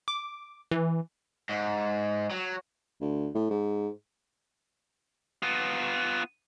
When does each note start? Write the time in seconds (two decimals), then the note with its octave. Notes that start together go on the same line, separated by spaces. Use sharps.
0.08 D6
0.71 E3
1.49 G#2
2.31 F#3
3.01 D2
3.35 A2
3.50 G#2
5.43 B3 F4